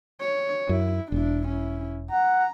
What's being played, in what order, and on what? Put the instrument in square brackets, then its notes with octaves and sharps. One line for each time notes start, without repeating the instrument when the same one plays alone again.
[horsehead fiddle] C#5
[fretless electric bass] F#2 [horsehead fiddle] E4
[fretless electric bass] E1 [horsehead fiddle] D4 E4
[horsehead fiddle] C#4 E4
[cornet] F#5 [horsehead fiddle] A#5